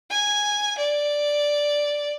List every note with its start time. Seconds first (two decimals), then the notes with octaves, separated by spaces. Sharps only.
0.10 G#5
0.78 D5